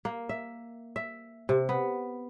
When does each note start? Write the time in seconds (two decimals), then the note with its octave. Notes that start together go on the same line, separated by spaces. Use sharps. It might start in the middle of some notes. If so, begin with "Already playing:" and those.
0.05 A#3
0.29 E5
0.96 E5
1.49 C3
1.69 B3